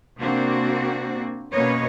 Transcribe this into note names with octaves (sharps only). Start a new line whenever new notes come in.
C3 A#3 C4 D4 F#4
B2 A#3 C#4 B4 C#5 D#5